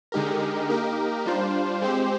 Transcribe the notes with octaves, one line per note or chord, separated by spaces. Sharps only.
D3 G#3 D#4 G4 A#4
A#3 D#4 G4 A#4
G3 D4 F4 C5
G#3 C4 G4 C5